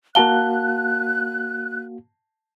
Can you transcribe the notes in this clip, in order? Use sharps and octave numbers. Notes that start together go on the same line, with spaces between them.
A#3 F#4 F5 A5 F#6 G7